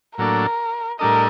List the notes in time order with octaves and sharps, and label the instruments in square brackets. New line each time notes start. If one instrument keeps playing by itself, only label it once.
[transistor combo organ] A2 F#3 A#3 D4 A4 [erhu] A#4
[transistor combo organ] A2 G3 D4 A4 D#5 [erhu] A#4